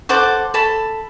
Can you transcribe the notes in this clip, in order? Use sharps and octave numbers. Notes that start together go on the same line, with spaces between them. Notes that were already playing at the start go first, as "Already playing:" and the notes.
A4 C5 F#5 D6
A4 A5 B5